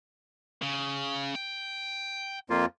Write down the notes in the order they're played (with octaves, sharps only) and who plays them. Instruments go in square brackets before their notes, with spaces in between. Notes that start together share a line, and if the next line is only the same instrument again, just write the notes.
[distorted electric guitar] C#3
G5
[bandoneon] F2 A#3 F4